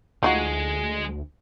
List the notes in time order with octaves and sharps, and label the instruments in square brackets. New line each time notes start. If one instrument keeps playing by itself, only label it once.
[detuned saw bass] D2 [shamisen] F3 D#4 F#4 [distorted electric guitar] G#3